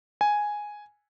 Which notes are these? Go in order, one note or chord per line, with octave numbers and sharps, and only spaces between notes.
G#5